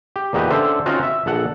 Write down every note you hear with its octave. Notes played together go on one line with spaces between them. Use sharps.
G4
E2 A#2 D#4 G4 B4
D3 C#4 A4 C5 E5
C4 C#4 D#4 F4 F#4
E5
A#1 A4 F#5